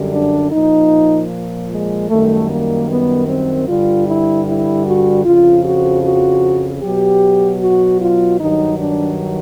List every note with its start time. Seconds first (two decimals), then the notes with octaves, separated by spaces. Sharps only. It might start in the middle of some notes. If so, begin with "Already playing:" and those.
Already playing: F#2 D3 G3
0.13 D4
0.52 A#2 F3 D#4
1.71 G#3
2.09 F#2 D#3 G3 A3
2.50 A#3
2.89 B3
3.28 C4
3.68 G2 D3 G3 F4
4.07 E4
4.47 E4
4.86 F#4
5.25 F2 C#3 F3 F4
5.65 F#4
6.03 F#4
6.83 B2 F#3 G4
7.61 F#4
8.01 F4
8.40 G2 D#3 F#3 D#4
8.79 D4